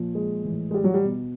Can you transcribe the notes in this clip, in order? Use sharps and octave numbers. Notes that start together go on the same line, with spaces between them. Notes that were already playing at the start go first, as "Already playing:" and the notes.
Already playing: A#2 F3
G#3
A2 E3
G#3
G3
F#3
G3
B2